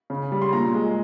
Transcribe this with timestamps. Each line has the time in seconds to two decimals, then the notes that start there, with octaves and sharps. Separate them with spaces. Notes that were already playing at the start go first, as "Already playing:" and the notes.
0.10 C#3
0.32 G3
0.42 C6
0.53 A#2 A#5
0.74 G#3